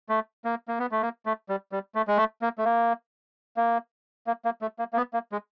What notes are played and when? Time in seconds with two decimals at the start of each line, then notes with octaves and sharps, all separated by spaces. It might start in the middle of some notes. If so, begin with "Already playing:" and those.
0.09 A3
0.45 A#3
0.68 A#3
0.79 B3
0.92 A3
1.02 A#3
1.26 A3
1.49 G3
1.72 G3
1.95 A3
2.08 G#3
2.18 A3
2.42 A#3
2.58 A3
2.65 A#3
3.57 A#3
4.27 A#3
4.45 A#3
4.62 A3
4.79 A#3
4.93 A#3
4.97 B3
5.14 A#3
5.32 G#3